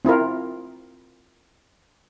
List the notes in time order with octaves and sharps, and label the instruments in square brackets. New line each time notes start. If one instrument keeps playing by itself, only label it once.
[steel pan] C4 E4 F4 A#4